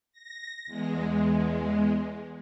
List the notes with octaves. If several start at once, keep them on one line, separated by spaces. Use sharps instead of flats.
A#6
E2 G#3